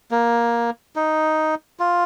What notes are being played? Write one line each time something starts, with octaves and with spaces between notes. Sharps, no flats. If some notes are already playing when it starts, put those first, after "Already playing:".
A#3
D#4
F4